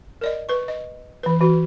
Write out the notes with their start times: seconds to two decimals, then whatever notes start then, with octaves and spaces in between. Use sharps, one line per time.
0.21 A#4 D5 D#5
0.49 B4 C#6
0.68 D#5
1.23 E3 B4
1.41 E3 F#4